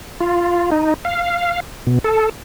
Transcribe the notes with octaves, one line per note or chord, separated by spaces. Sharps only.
F4
D#4
F5
B2
A4